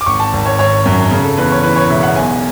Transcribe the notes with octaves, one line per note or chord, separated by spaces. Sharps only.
D6
G#1 C#6
A5
G#1
C#5
G#1 C#5
F#2
C#3
A4
E2 B4
C#5
E3 B4
C#5
E1 E5
F#5
B1 G#5